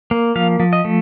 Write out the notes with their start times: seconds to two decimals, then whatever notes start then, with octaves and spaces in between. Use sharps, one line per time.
0.11 A#3
0.36 F3 F5
0.60 F3
0.73 D#5
0.85 A3